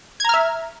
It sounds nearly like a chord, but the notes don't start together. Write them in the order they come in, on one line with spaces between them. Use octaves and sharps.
G#6 A#5 F6 E5